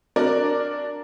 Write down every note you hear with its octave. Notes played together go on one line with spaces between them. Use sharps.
D4 F#4 A#4 D5